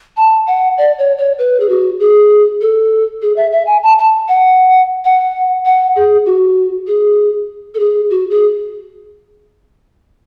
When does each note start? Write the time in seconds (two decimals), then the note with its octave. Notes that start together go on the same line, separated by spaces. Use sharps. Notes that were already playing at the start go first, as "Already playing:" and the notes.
0.17 A5
0.47 F#5
0.78 D5
0.98 C#5
1.18 C#5
1.38 B4
1.60 G#4
1.69 F#4
2.00 G#4
2.61 A4
3.22 G#4
3.36 E5
3.52 E5
3.67 G#5
3.83 A5
3.98 A5
4.28 F#5
5.05 F#5
5.66 F#5
5.96 G#4
6.26 F#4
6.87 G#4
7.74 A4
7.79 G#4
8.10 F#4
8.30 G#4